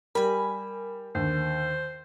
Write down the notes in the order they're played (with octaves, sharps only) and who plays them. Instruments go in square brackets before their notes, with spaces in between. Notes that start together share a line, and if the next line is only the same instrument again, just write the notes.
[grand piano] G3 [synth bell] A#4 [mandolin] G#5 B5
[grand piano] D#2 D3 [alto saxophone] C5